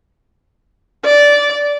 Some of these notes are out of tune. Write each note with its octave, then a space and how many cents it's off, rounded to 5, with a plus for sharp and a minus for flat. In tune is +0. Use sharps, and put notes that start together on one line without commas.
D5 -15